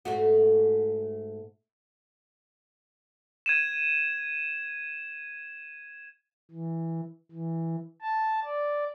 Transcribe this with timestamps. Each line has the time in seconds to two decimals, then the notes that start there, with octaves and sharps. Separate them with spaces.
0.05 G#2 A3 F#4
3.46 G#6 D#7 E7
6.51 E3
7.31 E3
8.02 A5
8.45 D5